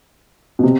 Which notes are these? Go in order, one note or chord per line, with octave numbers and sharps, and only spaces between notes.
B2
C3